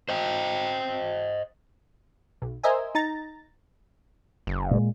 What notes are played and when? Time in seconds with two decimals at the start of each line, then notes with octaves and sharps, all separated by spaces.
0.09 C5 D#5 G5
2.42 B1
2.63 A#4 C5 D#5 E5 G#5
2.95 D#4 A#5 A6
4.47 F#1
4.71 A#2 G#3